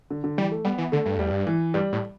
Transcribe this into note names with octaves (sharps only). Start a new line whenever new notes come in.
D3
D3
E3 G3
A3
G3 B3
E3
D3 A3
G2
E2 G3
G2
E3
G2 G3
A2